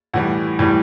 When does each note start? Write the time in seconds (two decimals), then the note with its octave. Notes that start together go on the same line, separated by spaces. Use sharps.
0.14 A2 E3 G3 F#5
0.59 A2 E3 G3